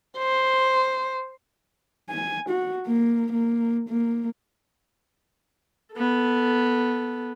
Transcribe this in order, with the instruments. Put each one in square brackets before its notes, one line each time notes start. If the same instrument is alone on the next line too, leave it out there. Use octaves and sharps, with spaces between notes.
[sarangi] C5
[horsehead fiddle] G#5
F#4
A#3
A#3
A#3
[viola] B3 A4